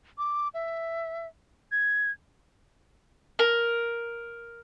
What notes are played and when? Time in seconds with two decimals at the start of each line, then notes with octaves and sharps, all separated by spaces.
0.18 D6
0.54 E5
1.72 G#6
3.39 A#4